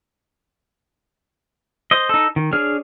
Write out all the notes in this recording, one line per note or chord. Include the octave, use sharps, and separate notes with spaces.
C5 D#5
D#4 A4
D#3
D4 G#4 C#5 F6